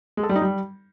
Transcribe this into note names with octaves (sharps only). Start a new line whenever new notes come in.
G#3
A4
G3
D#4
G3